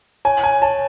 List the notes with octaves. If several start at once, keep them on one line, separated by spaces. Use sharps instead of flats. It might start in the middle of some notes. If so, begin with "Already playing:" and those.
C#5 G#5
G#5
C#5 A5